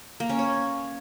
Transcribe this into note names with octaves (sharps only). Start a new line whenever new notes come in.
A#3
C#4
C#5